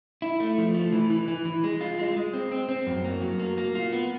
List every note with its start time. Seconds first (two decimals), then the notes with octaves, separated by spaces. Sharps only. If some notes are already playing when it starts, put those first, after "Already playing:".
0.22 E4
0.40 A3
0.58 F3
0.74 A3
0.93 E3
1.10 E3
1.28 E3
1.45 E3
1.64 G#3
1.81 F4
1.99 G#3
2.16 G#3
2.34 C4
2.52 C4
2.69 C4
2.87 F#2
3.04 A#3
3.22 F#3
3.40 A#3
3.58 A#3
3.75 F4
3.92 B3